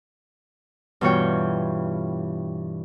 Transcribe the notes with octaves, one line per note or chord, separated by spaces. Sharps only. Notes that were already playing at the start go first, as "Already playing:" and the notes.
G2 B2 E3 F4 C#5 G5